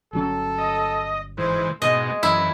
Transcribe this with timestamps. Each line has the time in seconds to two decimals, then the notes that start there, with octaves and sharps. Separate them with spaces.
0.13 G1 F#3 C#4 A4
0.58 D#5
1.38 G#2 E3 C5
1.82 G#2 B2 G#3 D#5
2.23 F#2 E3 E4